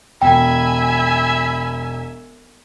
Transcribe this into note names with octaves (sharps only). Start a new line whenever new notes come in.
E1 E5 G5 G#5 B5